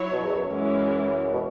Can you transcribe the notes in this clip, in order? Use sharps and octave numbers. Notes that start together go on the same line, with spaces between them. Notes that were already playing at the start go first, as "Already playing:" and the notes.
Already playing: F#3 E4 C#5
B2
E2
F#2
E3 G#3 C#4
B2